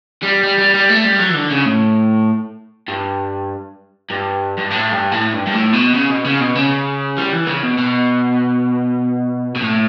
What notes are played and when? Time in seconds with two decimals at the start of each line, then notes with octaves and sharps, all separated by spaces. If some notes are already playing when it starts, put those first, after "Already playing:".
0.22 G3
0.43 G3
0.58 G3
0.74 G3
0.89 A3
1.04 G3
1.20 F#3
1.30 E3
1.34 D3
1.50 C#3
1.66 A2
2.88 G2
4.10 G2
4.58 G2
4.71 A2
4.92 G2
5.12 A2
5.34 G2
5.47 G2
5.53 A2
5.73 B2
5.95 C#3
6.10 B2
6.25 C#3
6.41 B2
6.55 C#3
7.17 G3
7.32 E3
7.47 C#3
7.62 B2
7.78 B2
9.56 B2
9.62 A2